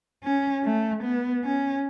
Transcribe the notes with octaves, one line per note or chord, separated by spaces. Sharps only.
C#4
A3
B3
C#4